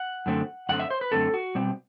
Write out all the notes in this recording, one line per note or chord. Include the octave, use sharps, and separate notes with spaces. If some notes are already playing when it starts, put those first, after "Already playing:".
Already playing: F#5
F#2 D3 A3 C4
F#2 D3 A3 C4 F#5
E5
C5
B4
F#2 D3 A3 C4 A4
F#4
B2 G3 C4